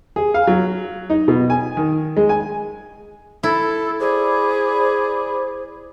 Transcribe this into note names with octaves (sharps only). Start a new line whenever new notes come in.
G#4
F5
F#3
D#4
B2
G#5
D#3
G#3
G#5
E4 A4
G#4 C5 D5 B5 D6